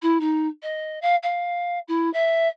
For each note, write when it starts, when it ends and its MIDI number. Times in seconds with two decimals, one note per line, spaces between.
0.02 0.17 64
0.20 0.47 63
0.62 0.99 75
1.02 1.15 77
1.22 1.78 77
1.87 2.11 64
2.13 2.47 76